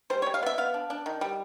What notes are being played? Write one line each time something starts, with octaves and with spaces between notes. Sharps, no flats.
G3 C5
C#5
G3
F5
B3 E5
B3 F5
D4
D4
D#3
G3